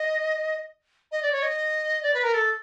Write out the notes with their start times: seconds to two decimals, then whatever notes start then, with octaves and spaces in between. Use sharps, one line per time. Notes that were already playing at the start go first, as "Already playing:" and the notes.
Already playing: D#5
1.12 D#5
1.22 D5
1.32 C#5
1.42 D#5
2.03 D5
2.14 B4
2.23 A#4
2.34 A4